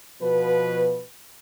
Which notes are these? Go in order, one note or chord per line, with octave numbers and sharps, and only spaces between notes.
B2 F3 B4